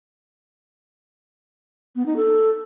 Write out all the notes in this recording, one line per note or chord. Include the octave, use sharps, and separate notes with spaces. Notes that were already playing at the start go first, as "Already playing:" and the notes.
B3
D#4
A4